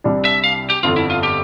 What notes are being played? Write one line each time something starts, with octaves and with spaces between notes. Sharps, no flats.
C2 C3 G3 D4
E5
F5
G4
G1 F2 D3 F4
E4
F4
G4